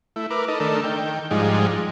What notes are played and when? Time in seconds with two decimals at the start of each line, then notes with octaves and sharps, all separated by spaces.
0.16 A3 E4
0.30 A#4 B4 D6
0.48 D#4 A4 D#5
0.60 D#3 A3 D4 A4 A#4
0.84 D#3 G5
1.31 G#2 F3 G3 G#3 D#4